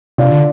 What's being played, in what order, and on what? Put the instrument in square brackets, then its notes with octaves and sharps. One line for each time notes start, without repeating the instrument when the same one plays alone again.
[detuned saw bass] C3 [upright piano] D4 F4
[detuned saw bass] D3